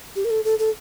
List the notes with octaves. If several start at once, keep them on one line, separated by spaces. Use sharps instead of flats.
G4
A#4
A4
A4
A4